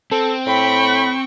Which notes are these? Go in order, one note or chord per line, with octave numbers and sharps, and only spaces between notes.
C4 A4
A2 G5 B5 C#6